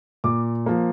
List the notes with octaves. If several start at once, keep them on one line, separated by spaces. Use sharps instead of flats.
A#2 D6
F3 A#3